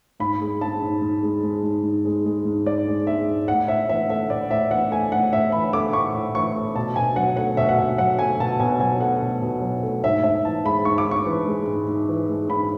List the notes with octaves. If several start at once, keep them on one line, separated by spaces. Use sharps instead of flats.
G#2 B5
G#3
G#3 A5
G#2
G#2
G#3
G#3
G#2
G#2
G#3
G#3
G#2
G#2 D5
G#3
G#3 E5
G#2
A2 F#5
A2 E5
E3 E5
A3 E5
A2 D5
A2 E5
E3 F#5
A3 G#5
A2 F#5
A2 E5
E3 B5
A3 D6
A2 C#6
A2
E3 C#6
A3
B2 A5
B2 G#5
F#3 F#5
A3 F#5
B2 E5
F#5
B2 E5
F#3 F#5
A3 G#5
B2 A5
B2 G#5
F#3 G#5
A3 F#5
B2
B2
F#3
A3
G#2 E5
G#2 E5
E3 A5
G#3 B5
G#2 C#6
D6
G#2
C#6
E3
G#3
G#2
G#2
E3
G#3
G#2 B5